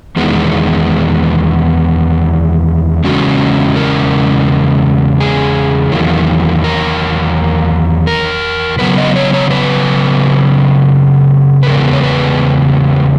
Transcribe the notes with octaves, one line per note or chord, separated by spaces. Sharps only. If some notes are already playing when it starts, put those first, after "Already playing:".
E2 D#3 G#3 B3
E2 C#3 G#3 C#4 F#4
A#4
G#4
E2 D#3 F#3 A#3
A#4
A#4
C#3 F#3 B3 B4
D#5
C#5
C#5
B4
B4
E2 C#3 G#3 B3 A#4
C#5
B4